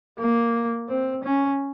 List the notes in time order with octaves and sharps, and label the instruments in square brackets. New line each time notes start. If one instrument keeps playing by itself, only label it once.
[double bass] A#3
C4
C#4